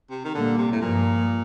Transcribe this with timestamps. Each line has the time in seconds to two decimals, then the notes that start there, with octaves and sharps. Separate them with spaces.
0.10 C3
0.24 D#3
0.34 A#2 D3 G3 A#3
0.57 C3
0.72 A2
0.81 G2 A#2 F3 A#3